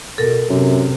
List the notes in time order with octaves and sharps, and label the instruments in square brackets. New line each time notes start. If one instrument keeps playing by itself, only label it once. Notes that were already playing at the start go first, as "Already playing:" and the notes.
[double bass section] B2 [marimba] A4 A#4
[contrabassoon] F#2 [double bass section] C3